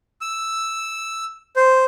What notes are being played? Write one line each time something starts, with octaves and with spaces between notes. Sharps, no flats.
E6
C5